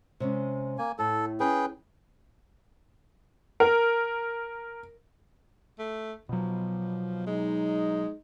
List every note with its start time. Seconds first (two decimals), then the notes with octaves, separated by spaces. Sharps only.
0.20 C3 G#3 C#4
0.78 A#3 G#5
0.99 A2 A4
1.40 C#4 G#4 B4 G5
3.60 A#4
5.79 A3
6.29 B2 F3 F#3
7.27 G#3 D#4